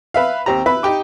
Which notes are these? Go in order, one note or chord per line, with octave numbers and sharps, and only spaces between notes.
B4 E5 F5
D#2 C4 G4 A#5
E4 B4 E5 B5
D#4 G4 G5 D6